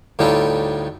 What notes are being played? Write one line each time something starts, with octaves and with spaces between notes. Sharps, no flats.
D2 A2 G3 D#4 F4 A4